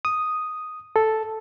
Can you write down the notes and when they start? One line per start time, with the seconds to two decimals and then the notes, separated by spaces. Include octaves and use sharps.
0.05 D#6
0.96 A4